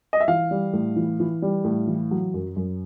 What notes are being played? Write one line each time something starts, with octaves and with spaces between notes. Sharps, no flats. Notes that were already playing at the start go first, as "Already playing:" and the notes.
D#5
E5
E3 F5
G3
A2
E3
E3
G3
A2
E3
F#3
F#2
F#2